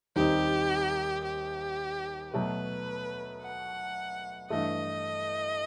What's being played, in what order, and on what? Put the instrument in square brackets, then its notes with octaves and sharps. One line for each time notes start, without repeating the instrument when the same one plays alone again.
[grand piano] D#2 D#3 G3 C4 D#4 [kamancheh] G4
[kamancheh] G4
[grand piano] B2 F#3 A3 [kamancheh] B4
[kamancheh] F#5
[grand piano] G2 E3 A3 [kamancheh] D#5